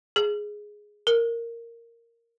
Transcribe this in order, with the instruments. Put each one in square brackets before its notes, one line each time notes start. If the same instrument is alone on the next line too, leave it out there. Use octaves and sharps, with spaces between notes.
[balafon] G#4
A#4